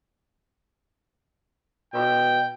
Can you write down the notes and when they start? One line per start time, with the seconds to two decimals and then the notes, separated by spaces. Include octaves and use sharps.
1.94 B2 G5